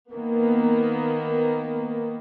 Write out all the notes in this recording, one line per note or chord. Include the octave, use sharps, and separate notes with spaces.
D#3 A#3 B3